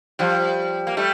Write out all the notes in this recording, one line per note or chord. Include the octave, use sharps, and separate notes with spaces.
F3 G3
A#3
G3 A3